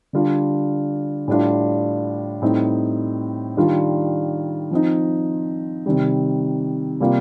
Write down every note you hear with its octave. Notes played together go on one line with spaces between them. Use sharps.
D3 G3 D4 F4
A2 G3 D4 F4
A2 G3 C4 D#4
D#3 G3 D4 F4
F3 C4 D#4
C3 D#3 G3
C3 G3 A#3 F4